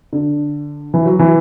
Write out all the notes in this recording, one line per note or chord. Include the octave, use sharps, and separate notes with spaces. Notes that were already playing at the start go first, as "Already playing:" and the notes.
D3
E3
F#3
E3